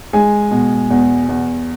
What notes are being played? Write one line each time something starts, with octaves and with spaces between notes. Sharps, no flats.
G#3 G#5
B2
E2
E2